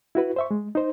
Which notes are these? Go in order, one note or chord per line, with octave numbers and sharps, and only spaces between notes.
E4 F#4 B4
C5 E5 C#6
G#3
D#4 C5